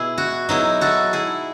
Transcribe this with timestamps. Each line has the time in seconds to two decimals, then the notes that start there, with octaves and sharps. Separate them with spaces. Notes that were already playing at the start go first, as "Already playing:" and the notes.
Already playing: B2 E4 G#4
0.18 F#4
0.49 F#3 B3 D#4 E4 G#4
0.81 F#4 A4
1.13 E4 G#4